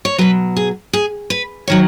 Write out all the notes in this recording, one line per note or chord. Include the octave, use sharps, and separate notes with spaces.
C#5
B2 F#3 B4
G#4
G#4
B4
D#3 F#3 C#5